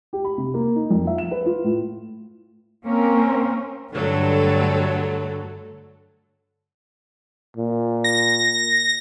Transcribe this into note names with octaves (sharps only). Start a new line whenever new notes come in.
G4
B5
C3
A#3
D#4
F2
E5
E7
B4
F4
A2
A#3 C4 C#4 A#4
G2 D3 F#3 A3 A4
A#2
A#6